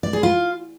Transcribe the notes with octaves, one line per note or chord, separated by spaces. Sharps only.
D5
G#4
F4